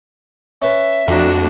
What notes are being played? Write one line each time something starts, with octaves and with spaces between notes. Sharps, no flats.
C#4 B4 E5
F2 A3 D4 F#4 A#5 C6